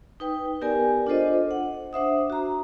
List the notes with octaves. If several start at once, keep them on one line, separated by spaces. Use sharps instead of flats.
D#4 B4 G5
B3 G4 A#4 D5 G#5
D4 F4 A4 C5 D#5
F#5
D4 C5 E5 D#6
F#4 A#5